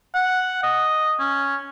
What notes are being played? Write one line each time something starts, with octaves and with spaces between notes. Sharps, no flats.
F#5
D#5
C#4